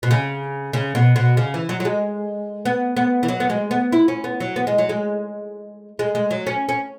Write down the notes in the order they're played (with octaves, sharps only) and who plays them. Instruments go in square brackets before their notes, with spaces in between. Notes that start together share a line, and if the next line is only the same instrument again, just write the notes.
[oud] B2
C#3
C#3
B2
B2
C#3
E3
F#3
F#3
G#3
B3
B3
E3
F#3
B3
G#3
B3
E4
C#4
B3
F#3
B3
G#3
F#3
G#3
G#3
G#3
F#3
C#4
C#4